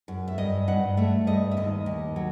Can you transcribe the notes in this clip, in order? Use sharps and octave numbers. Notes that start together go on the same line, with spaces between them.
F#2
E5
G2 D#5
G2 F#5
A3 E5
G2 D#5
E5
D#2 D#5
D#2
F#3